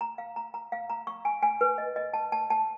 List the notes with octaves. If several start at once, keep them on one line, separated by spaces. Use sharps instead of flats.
A#5
F5
A#5
A#5
F5
A#5
C#6
G#5
G#5
B4
D#5
D#5
A5
A5
A5